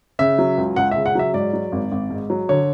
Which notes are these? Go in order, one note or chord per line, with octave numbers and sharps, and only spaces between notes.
C#3 E5
F#3
C#2
C#2 F#5
C#3 E5
F#5
F#3 E5
G#2 D5
F#3
G#1
G#1
G#2
F#3
D3 C#5